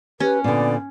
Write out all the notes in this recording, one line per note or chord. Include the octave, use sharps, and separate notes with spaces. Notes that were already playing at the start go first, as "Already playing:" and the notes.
C#4 G4 B4
A#2 D3 B3 D5